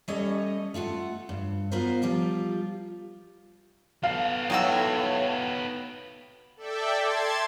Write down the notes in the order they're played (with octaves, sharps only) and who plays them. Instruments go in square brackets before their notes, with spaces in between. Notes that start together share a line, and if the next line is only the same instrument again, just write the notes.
[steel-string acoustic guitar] G3 A3 C#4 A4 C#5 D#5
A3 F4 A4 F#5
G2
B3 F4 F#4 A#4 C5
F3 G3 F4
[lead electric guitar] B3 A4 [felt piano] F5
[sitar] A2 F#3 [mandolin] D#4 F#4 E6
[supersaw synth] A4 D5 E5 G5
A5 C6 G#6 A6